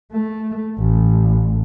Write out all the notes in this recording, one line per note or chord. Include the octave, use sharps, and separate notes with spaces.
A3
A1